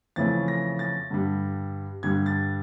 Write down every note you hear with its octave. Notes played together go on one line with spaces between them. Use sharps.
F2 C#3 E3 A3 A6
A#6
A6
G2 D3 G3
G2 D3 G3 G#6
A6